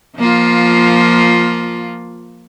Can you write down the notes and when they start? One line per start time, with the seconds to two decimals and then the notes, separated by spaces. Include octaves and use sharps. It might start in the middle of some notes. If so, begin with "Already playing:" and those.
0.17 F3 A#3 F4